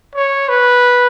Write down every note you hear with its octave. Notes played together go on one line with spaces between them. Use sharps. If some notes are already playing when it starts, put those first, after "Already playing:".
C#5
B4